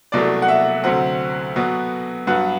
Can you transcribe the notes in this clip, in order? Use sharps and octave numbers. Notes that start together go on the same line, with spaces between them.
C2 B2 F#3 A3 D5
F#5
E5
D2 C3 F#3 C4 F#5
B2 F#3 B3
G2 F#3 B3 F#5